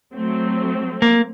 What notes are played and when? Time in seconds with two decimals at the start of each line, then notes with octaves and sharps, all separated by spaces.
0.14 F#3 A3 C4
1.02 A#3